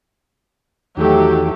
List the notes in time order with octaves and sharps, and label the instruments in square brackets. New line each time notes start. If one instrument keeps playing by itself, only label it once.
[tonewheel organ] E2 D#3 [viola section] F#3 A3 G4